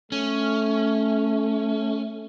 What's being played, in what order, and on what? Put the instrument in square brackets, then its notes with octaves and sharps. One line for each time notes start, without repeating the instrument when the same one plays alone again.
[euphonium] A3 [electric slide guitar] C#4